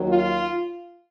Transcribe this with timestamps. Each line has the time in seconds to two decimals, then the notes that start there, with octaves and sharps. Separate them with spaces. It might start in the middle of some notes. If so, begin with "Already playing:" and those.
Already playing: D#2 D#3 F#3
0.09 F4